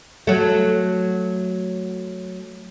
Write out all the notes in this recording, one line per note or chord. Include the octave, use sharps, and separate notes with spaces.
F#3 A3